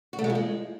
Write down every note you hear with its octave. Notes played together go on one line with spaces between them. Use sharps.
F#4
A3
G#3
F3
G#3